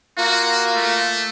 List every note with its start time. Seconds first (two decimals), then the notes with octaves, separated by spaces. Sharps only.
0.18 A#3 F4 F#4
0.76 A3